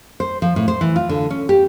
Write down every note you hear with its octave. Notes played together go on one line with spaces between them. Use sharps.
C5
F3
A2
C5
E3
F4
D3
C#4
G4